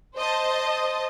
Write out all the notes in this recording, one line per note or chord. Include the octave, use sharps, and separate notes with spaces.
C5 D#5 A5